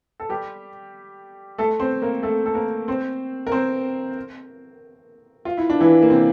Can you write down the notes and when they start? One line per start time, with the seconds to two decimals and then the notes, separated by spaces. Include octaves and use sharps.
0.20 A4
0.29 G3 G4
1.58 A3 A4
1.80 C4 C5
2.02 A#3 A#4
2.23 A3 A4
2.46 A4
2.55 A#3 A#4
2.88 C4 C5
3.47 A#4
3.52 C4 C5
5.45 F4
5.57 E4
5.70 D4
5.80 E3 E4
6.02 A#3
6.10 C3 C4